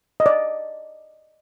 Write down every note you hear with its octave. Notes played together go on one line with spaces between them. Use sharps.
D#5
D5